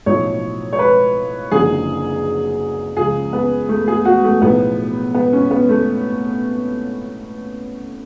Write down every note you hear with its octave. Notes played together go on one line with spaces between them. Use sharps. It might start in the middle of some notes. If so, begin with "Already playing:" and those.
B1 A2 F3 C#5
C#5
B4
F#1 F#2 D3 F3 G#4
C#2 C#3 F3 G#4
B3
A3
G#4
F#4
A3
B1 A2 F3 B3
B3
C#4
B3
A3